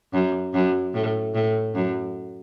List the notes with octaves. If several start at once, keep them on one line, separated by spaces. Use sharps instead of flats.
F#2
F#2
A2
A2
F#2